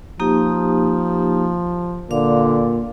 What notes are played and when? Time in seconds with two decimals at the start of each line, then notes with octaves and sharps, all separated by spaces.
0.20 F3 A#3 D#4 G4
2.11 A#2 D3 F5 D6